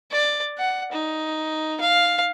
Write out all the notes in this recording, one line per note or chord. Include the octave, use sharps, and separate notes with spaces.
D5
F#5
D#4
F5